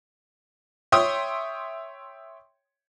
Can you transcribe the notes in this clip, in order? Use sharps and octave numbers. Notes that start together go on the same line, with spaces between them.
C#5 E5 G5 C6 D#6